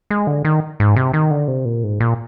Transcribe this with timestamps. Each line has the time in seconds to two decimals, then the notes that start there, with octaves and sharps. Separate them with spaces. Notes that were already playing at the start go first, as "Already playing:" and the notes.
0.10 G#3
0.27 D3
0.45 D#3
0.80 G#2
0.96 C3
1.13 D#3
1.31 D3
1.48 C3
1.65 A#2
1.84 G#2
2.00 A#2